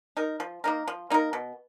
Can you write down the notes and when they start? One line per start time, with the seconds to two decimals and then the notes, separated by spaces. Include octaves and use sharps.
0.17 D#4 A#4
0.40 F3
0.64 A#3 D#4 A#4
0.88 F3
1.10 A#3 D#4 A#4
1.33 B2